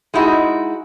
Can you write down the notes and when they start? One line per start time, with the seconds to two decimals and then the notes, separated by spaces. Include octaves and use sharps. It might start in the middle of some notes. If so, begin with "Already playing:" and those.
0.14 G#3 D#4 E4 F#4